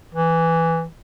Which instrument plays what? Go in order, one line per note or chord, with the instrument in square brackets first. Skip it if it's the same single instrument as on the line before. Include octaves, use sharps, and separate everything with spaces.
[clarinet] E3